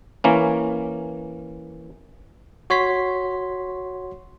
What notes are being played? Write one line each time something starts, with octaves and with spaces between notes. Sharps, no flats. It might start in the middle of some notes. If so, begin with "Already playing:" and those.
E3 A#3 C#4
F#4 C#5 C6 B6